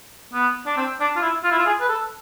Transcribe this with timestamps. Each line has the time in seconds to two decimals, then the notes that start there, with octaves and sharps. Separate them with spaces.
0.34 B3
0.66 D4
0.77 C4
1.00 D4
1.16 F4
1.22 E4
1.44 F4
1.51 E4
1.59 F4
1.66 G#4
1.81 B4
1.88 A4